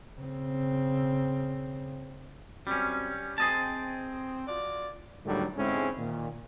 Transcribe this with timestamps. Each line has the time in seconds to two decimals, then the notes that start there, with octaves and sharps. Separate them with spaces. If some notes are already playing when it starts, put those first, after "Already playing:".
0.19 C#3 C4
2.67 F#2 G3 C4 C#4
3.38 C4 G#4 D#5 A5
4.47 F4 F#4 D5
5.25 D#2 A2 D3 D#3 F#3 G3
5.57 G#2 D3 G#3 C4 C#4 E4
5.98 A#2 D#3